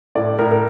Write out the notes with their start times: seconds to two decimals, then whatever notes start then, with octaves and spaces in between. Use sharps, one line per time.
0.15 A2 D5
0.39 A2 A#4
0.52 A#4